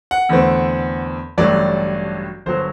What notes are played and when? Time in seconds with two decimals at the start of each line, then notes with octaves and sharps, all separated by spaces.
0.11 F#5
0.29 E2 D3 A3 C4
1.38 A1 G2 F#3 A3 D5
2.46 G1 F#3 C5